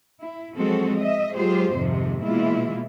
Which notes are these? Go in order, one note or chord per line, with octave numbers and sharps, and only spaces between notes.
E4
F3 F#3 G#3 C4 F#4 A4
D#5 E5
F#3 G#3 F4 G4 G#4 C5
F2 G#2 C3 D#3 F3
B2 E3 G#3 A#3 E4 F4